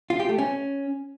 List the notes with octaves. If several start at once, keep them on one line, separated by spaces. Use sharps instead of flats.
F4
G4
A3
C#4